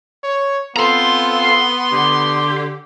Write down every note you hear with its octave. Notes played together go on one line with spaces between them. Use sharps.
C#5
B3 C4 F4 A4 A#5 C6
D3 G4